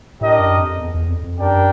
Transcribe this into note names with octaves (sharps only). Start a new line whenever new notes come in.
A2 D4 G4 A#4 D#5
F#2
F2
E2
E2
F2
F2
F#2 D4 G4 A#4 D5 G5